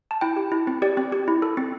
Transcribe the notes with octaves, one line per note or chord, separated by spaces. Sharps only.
A5
E4 G5
G4
E4
C4
G4 D5
C4
G4
E4
A4
C4